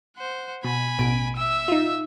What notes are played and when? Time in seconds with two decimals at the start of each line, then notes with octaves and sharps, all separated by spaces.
0.16 C5 F#5
0.64 B2 G#5 B5
0.99 A1 B2 D7
1.36 E5 E6
1.68 D#4 F4